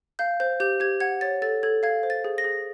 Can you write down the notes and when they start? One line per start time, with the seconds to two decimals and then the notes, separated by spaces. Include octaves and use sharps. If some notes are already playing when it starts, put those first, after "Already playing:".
0.19 F5 G6
0.40 C5 G6
0.60 G4 G6
0.80 G4 G#6
1.00 F#5 G#6
1.21 C#5 A6
1.42 A4 A6
1.63 A4 G#6
1.83 F5 G#6
2.03 C5
2.10 A6
2.24 G#4
2.38 A#6
2.44 G#4